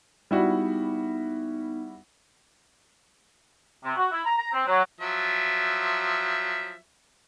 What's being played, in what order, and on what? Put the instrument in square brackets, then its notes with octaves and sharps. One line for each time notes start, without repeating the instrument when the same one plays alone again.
[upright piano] G3 E4 F#4 [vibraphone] B3 D#4
[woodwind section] C3
F#4
E4
A#5
A#5
C4
F#3
[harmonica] F3 F#3 E5